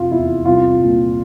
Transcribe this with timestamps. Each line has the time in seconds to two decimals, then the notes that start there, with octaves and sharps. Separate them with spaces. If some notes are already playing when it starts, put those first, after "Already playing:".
Already playing: F1 F4
0.11 E2 E4
0.45 C2 F4
0.80 A#2